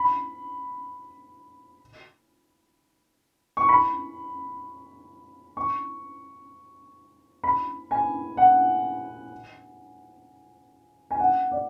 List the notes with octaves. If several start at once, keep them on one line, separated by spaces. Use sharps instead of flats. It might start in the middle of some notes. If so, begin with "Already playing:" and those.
Already playing: B5
C#6
B5
C#6
B5
G#5
F#5
G#5
F#5
D5